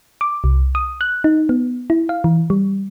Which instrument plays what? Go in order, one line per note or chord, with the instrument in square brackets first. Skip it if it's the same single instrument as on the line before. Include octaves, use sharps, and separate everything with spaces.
[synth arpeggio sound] D6
C2
D#6
F#6
D#4
B3
E4
F5
E3
G3